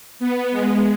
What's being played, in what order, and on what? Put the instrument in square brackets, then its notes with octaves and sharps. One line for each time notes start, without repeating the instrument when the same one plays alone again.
[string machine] B3
G#3